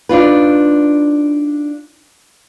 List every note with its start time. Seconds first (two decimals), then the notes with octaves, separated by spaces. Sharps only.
0.09 D4 D#4 F4 B4